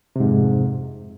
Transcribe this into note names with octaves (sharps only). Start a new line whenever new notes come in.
F2 G#2 C3